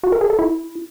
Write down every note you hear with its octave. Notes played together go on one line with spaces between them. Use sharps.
F#4
A#4
G#4
A4
E4